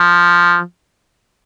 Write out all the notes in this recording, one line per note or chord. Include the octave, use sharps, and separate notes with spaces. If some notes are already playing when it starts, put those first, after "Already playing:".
Already playing: F3